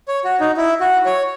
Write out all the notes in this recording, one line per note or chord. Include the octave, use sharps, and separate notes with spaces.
C#5
F#4
D#4
E4
F#4
C#5